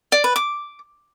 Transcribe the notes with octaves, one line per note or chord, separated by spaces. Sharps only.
D5
B4
D6